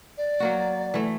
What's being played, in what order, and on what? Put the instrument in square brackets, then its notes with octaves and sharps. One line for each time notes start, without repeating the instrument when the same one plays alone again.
[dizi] D5
[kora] F#3 A#3 F#4
E3 A3